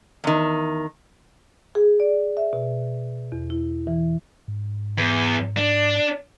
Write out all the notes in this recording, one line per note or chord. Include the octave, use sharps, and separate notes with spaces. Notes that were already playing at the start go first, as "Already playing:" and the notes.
E2 D#3
G#4
D5
E5
B2
E2
E4
E3
G#2
E2
D4